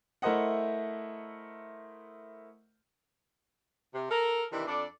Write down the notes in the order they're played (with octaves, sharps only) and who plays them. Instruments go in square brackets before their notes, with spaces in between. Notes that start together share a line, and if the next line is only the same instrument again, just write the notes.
[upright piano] A3 E4 A#4 C5 D#5 F#5
[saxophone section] C3
A4 A#4
C3 D#3 E3 D4 E4
F2 D4 A4 D5